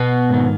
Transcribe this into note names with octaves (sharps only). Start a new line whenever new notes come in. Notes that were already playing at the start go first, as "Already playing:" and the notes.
Already playing: B2 B3
G#2 D#3